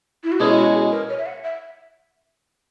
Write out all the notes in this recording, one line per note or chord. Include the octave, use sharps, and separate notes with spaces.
E4
F#4
B2 G#3 C#4 E4 G#4
F#4
G#4
A#4
C#5
E5
F#5
E5